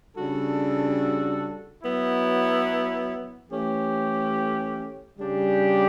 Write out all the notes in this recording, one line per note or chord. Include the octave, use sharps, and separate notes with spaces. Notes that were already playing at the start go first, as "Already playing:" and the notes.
C#3 G3 D4 F#4 A4
F#3 B3 E4
E3 A3 C#4 G4
C#3 G3 D4 G4